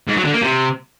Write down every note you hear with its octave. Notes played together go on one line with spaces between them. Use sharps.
G#2
F#3
D3
A#3
C3